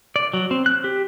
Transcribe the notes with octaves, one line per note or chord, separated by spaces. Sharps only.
D5
F#3
C4
F#6
G4